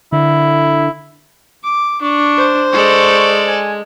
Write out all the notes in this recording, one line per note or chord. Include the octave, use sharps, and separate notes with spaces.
D3 E4
D6
D4 C#6
C5
G#3 A4 D5 C#6
G#5